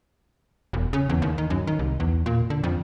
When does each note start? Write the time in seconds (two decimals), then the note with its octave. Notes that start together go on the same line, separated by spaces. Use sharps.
0.73 E1
0.93 C#3
1.09 E2
1.22 D#2
1.38 D#3
1.50 F#2
1.67 D#3
1.79 C2
2.00 E2
2.26 A#2
2.50 D3
2.63 F2